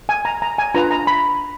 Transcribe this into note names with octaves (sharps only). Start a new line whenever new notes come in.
G#5
A#5
A#5
G#5
D4 F4 B4 A#5
A#5
B5